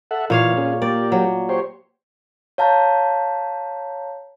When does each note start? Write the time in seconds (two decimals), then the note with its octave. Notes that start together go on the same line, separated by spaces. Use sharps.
0.11 A4 E5 F#5
0.30 A#2 E3 C#5 F5
0.57 C#4 G#4
0.82 A#3 G4 D5
1.12 F#3
1.49 G4 C5 C#5
2.58 C#5 F5 A5 A#5 G6